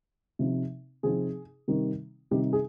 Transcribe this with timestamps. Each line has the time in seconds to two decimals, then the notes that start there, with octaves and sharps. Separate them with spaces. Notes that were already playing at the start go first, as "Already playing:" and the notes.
0.39 C3 F3 C4 D#4
1.03 C3 F3 C4 D#4 G#4
1.68 C3 D#3 G3 C4 D#4
2.31 C3 D#3 G3 C4 D#4 G4
2.53 G#4